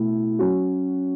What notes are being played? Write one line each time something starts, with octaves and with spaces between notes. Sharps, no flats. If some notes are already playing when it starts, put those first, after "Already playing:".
Already playing: B2 A3 E4
F#3 C#4 F#4